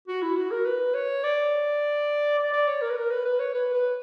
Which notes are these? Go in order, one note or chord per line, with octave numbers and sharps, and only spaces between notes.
F#4
E4
F#4
A#4
B4
C#5
D5
D5
D5
C#5
A#4
B4
A#4
B4
B4
C#5
B4
B4